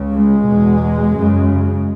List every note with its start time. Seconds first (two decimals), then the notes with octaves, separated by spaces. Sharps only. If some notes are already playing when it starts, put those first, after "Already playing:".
Already playing: C#2 C#3
0.14 G#3
0.47 E2 B2
1.13 F#2 C#3